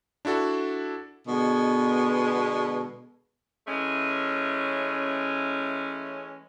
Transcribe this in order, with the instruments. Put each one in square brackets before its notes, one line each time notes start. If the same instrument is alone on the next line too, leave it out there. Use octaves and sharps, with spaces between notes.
[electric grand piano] D4 E4 F#4 A4
[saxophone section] B2 D3 G#3 B3
E3 G#3 A3 C#4